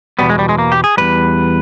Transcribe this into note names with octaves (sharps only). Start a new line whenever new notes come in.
E2 B2 G3 B3
G#3
G3
G#3
A#3
G4
G#4
E2 B2 G3 B4